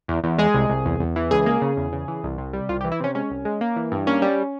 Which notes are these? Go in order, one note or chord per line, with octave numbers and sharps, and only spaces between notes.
E2
E2
G#3 G#4
C2
C2
E2
E2
E3
C#2 G#4
A#3
C#3
E2
C#3
E3
C2
C3
G3
C2 F4
G4
E3
E4
C3 C#4
G#3 C#4
C2
G#3
A#3
E3
G2
A#3 C#4
G3